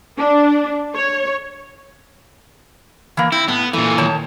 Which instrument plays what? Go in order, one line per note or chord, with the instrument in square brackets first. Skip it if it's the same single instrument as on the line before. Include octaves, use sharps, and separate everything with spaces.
[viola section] D4
C#5
[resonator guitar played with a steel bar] E3 A#3
[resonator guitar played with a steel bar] C4 [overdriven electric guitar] E4
[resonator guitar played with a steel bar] A2 [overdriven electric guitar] B3
[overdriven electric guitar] A#2 E3 [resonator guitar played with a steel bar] A3
[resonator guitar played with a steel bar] D#3 C#5 A5